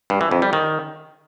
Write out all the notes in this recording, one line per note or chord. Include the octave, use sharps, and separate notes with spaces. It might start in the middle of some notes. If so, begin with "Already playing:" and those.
G2
E3
F2
G3
D#3